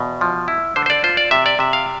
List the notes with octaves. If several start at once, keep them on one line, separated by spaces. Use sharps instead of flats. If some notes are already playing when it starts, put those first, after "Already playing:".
Already playing: E2 B2
F3
E4
D3 C5
C5
D5
F4 C5
D5
C3 E5
D5
C3 E5
F5